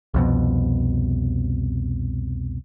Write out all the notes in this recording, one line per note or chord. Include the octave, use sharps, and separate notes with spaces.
C2 F2 B2